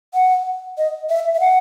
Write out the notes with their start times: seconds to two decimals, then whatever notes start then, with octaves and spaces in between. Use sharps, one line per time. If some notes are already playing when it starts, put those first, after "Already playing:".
0.14 F#5
0.78 D#5
1.10 E5
1.35 E5
1.40 F#5